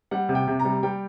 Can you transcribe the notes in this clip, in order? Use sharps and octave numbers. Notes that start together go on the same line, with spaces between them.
G3 F#5
C3
G5
C3
A#5
G3
G3 G5